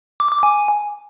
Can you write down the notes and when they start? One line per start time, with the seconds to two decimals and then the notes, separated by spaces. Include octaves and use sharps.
0.20 D6
0.32 D6
0.43 G#5